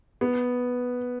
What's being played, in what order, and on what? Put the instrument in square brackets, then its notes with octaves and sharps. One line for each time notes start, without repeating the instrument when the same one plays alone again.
[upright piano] B3